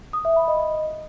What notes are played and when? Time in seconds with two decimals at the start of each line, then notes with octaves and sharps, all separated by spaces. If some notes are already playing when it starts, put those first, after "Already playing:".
0.13 D#6
0.25 E5
0.36 B5
0.48 D#5
0.59 D#5